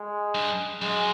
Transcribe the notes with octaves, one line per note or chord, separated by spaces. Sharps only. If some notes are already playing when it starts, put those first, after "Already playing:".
Already playing: G#3
G2
F#2 G#3